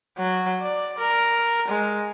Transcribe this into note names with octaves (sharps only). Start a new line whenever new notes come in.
F#3
D5
A#4
G#3